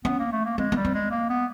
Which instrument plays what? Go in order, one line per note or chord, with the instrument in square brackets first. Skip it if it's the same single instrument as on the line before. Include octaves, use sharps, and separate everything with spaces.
[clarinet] B3 [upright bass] C#4
[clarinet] A#3
A3
A#3
[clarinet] G#3 [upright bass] C4
[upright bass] B3
[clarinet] G3
[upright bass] C4
[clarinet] G#3
A#3
B3